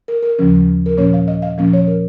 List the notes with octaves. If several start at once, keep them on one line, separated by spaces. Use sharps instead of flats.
A#4
A#4
D#2 C#3 F3 C#4
A#4
A#2 F3 A#3 C#4 C#5
F5
D#5
F5
A#2 F3 A#3 C#4 F5
C#5
A#4